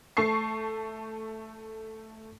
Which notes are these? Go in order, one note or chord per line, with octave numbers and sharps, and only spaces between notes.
A3 A5 C#6 C7